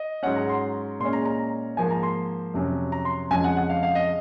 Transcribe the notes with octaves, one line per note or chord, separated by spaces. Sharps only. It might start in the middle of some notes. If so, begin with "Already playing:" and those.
Already playing: D#5
G#2 F#3 C#4 F#5
A#5
C6
A#2 G#3 C#4 C6
A#5
A#5
G#2 F3 A#3 G#5
A#5
C6
F2 C3 F#3 C#4
A#5
C6
F2 C#3 F3 G#3 G#5
F#5
F#5
F5
F5
D#5